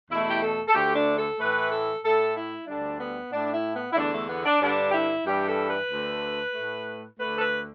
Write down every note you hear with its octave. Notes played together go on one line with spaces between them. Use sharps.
E2 B2 A3 E4
G4
A4
A4
D2 D3 A3 G4
D4
A4
A2 E3 A3 B4
A4
A2 A3 A4
E4
D2 D3 G3 D4
B3
A2 A3 D4
E4
B3
E4
E2 D3 A3 D4
A3
B3
D4
G2 D3 G3 D4
G4
E4
G2 E3 G3 G4
A4
B4
D2 D3 A3
A2 A3
D2 D3 A3 B4
A4
B4